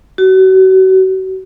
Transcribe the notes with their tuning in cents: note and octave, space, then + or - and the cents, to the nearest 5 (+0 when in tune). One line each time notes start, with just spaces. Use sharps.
F#4 +35